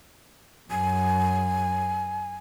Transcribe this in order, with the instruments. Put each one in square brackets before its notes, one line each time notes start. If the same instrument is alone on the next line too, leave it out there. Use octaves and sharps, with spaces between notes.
[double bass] F#2 [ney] G#5